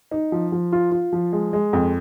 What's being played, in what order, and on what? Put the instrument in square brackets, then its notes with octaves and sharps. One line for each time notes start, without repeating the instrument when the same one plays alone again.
[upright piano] D#4
F3
F3
F4
F4
F3
G#3
G#3
F2